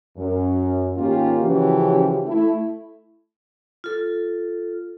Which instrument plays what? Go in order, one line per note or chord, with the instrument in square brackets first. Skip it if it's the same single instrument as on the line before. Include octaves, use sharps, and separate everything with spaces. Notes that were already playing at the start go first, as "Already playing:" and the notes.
[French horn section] F#2
G#2 D#3 A#3 C#4 F4 G4
C#3 E3 F3 C#4 F#4 G4
A3 E4
[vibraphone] F4 A4